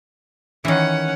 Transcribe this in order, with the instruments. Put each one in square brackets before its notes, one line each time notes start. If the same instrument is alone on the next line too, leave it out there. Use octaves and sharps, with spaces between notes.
[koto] D#3 E3 [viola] C#4 F#5